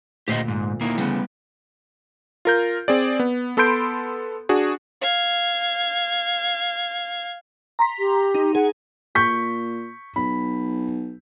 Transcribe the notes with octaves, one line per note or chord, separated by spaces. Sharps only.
D2 A#2 G4 C5 D#5
G#2
A#3 D#4 E4
D2 C#3 E3 G3 B3
F4 A#4 G6
C4 G#4 D5
B3
B3 A4 B5 C6 G6 D7
D4 F#4 G#4
F5 G#6
A#5 C6 B6
G4
D#4
G#4 F#5
A#2 C#6 G6 B6
B1 B5